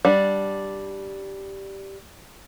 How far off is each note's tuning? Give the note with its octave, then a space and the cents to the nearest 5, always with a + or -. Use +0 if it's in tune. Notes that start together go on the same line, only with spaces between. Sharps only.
G3 -5 D4 +0 F#5 +0